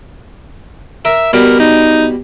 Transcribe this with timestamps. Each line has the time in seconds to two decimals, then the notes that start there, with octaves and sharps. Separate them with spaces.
1.05 A#4 E5
1.33 B2 G3 A#4
1.60 D#4